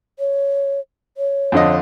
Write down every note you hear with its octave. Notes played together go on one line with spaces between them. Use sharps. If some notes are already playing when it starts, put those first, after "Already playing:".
C#5
C#5
F2 D3 D#5